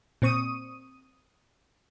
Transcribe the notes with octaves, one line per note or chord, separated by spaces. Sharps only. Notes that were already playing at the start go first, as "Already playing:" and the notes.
A#2 C4 C#6 D#6 D#7